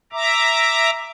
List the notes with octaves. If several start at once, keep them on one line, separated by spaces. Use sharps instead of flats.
E5 A#5 D6